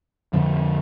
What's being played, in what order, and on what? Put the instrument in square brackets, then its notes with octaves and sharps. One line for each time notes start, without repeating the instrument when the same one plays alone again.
[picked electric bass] F2 D3 F3